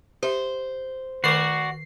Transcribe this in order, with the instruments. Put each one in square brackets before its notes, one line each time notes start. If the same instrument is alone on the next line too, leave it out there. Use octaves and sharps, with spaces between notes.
[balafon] G4 E5 [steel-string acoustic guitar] C5
[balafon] D#3 A#4 C#6 [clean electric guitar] F#4 D5 [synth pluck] C7